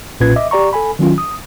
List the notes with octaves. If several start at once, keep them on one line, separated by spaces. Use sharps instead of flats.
B1 A#2 C#4 F4 B4 G#6
D#5 E5 D6
G4 D5 A#5 C#6
A4 G#5 B5
D#3 F#3 C#4 F4
D#6